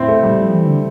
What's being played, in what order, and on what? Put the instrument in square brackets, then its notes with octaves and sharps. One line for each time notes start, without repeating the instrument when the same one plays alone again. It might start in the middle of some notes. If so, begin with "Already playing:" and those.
Already playing: [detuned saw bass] A2 [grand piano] C4 E4
[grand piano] A3
G3
[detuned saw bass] F3
E3
D3